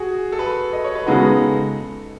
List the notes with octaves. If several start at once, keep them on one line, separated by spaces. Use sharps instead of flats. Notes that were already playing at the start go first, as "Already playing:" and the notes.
Already playing: F#4 G#4
A4
B4
D#5
C#5
B4
C#3 G#3 B3 D#4 F#4 A4